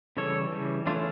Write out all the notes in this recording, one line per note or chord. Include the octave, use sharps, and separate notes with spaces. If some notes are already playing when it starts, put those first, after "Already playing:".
C#3 E3 G3 A4 C#5
C#3 E3 G3
E3 A3 C#4 D4 F4